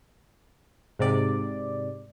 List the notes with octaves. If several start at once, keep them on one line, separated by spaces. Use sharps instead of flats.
G#2 C3 D5